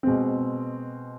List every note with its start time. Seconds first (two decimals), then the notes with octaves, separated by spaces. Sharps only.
0.03 B2 G#3 C4